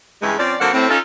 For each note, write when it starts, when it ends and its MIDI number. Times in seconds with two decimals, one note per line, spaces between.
0.22 0.34 43
0.22 0.34 49
0.22 0.34 52
0.22 0.34 56
0.39 0.54 53
0.39 0.54 60
0.39 0.54 61
0.39 0.54 74
0.60 0.69 50
0.60 0.69 54
0.60 0.69 58
0.60 0.69 60
0.60 0.69 66
0.60 0.69 78
0.73 0.89 45
0.73 0.89 60
0.89 0.97 61
0.89 0.97 63
0.89 0.97 65
0.89 0.97 69